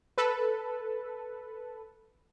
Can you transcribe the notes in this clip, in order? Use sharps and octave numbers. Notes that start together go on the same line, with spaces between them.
A4 B4